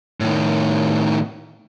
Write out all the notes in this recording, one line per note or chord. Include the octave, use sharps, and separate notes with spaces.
A2 D#3